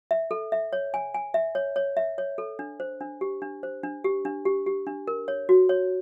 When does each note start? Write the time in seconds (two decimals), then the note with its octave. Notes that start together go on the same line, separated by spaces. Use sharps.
0.11 E5
0.31 A4
0.52 E5
0.73 C#5
0.94 G#5
1.14 G#5
1.34 E5
1.55 C#5
1.76 C#5
1.97 E5
2.18 C#5
2.38 A4
2.59 D4
2.80 C5
3.01 D4
3.21 G4
3.42 D4
3.63 C5
3.83 D4
4.04 G4
4.25 D4
4.45 G4
4.66 G4
4.87 D4
5.08 A#4
5.28 C#5
5.49 F#4
5.69 C#5